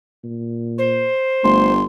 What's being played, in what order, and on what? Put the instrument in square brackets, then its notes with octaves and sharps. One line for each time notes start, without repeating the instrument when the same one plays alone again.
[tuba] A#2
[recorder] C5
[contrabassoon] G1 [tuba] A3 [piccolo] C6